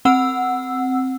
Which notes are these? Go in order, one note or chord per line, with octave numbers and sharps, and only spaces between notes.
C4 F#5 E6